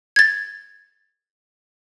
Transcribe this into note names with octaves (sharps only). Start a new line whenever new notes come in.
G#6 A6